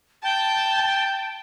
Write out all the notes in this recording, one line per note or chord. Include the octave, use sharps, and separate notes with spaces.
G5 A5